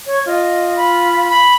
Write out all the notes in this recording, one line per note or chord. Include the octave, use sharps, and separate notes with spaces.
C#5
F4 D#5
B5
B5